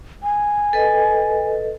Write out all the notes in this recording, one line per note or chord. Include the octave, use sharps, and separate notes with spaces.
G#5
A4 B4 D#5